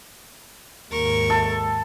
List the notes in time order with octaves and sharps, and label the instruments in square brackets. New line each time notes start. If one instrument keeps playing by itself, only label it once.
[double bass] D#2 G#2 [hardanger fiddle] A#4 C#6
[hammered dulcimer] A4